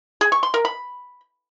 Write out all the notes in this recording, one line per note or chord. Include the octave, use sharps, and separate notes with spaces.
G#4
C#6
C6
A#4
B5